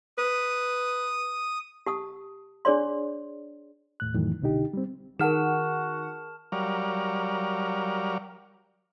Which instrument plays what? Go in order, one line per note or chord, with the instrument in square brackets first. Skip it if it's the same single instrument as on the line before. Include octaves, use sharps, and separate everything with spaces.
[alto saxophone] B4 [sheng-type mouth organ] D#6
[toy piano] G4 A5 D#6
D4 G#4 C#5 D5 C6
[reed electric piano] D#2 A2 F#6
F2 A2 D#3 E3 F#3
C2 B2 D3 D#4 G4
G3 C4
[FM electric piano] D#3 F#5 [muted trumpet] F#4 [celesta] G#4 A#4 [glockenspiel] A5 F6 E7
[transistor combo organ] F#3 G3 A#4 C#5 D5 F5